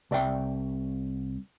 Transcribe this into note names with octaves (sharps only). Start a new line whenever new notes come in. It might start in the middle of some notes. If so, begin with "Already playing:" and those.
C2 D5 E5 G5